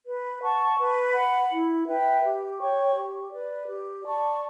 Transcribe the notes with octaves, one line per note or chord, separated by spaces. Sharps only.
B4
F#5 A5 C#6
B4
F#5 B5
E4
B4 E5 G5
G4
C#5 G5 C#6
G4
B4 D5
G4
D5 A5 C#6